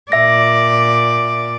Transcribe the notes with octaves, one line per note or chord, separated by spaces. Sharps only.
A#2 D5 E5 A#6